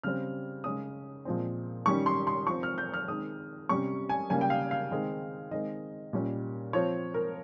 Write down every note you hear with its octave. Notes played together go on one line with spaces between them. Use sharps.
C#3 G3 C4 F6
C#3 G#3 C#4 D#6
A#2 F3 G#3 C4
D#3 G3 C#4 C#6
C6
C6
F3 C4 C#6
F6
G6
F6
D#3 G#3 C4 D#6
C3 G3 C#4 C#6
G#5
C#3 G3 A#3 G#5
G5
F5
F5
D#3 G#3 C4
D#3 G#3 C4 D#5
A#2 G3 C#4
F3 C4 C#5
A#4